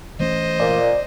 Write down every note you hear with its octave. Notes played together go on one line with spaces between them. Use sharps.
E3 A3 C#4 C5 D#5
A#2 D5